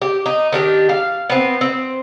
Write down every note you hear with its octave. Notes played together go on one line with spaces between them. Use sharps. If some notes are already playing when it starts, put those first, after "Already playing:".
G4
D#4
D#3 D4 G4
F5
B3 C4
C4